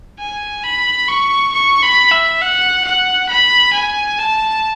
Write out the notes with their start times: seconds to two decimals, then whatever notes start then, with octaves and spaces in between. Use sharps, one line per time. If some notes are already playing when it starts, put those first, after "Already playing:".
0.19 G#5
0.64 B5
1.08 C#6
1.53 C#6
1.83 B5
2.12 E5
2.42 F#5
2.85 F#5
3.29 B5
3.73 G#5
4.19 A5